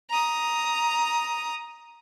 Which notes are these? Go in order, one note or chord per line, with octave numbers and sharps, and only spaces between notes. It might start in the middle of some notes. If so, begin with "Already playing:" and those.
A#5 D#6